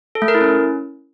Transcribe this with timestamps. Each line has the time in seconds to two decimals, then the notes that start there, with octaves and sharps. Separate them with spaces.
0.15 A4
0.22 A3
0.28 A#4
0.35 E4
0.41 C#4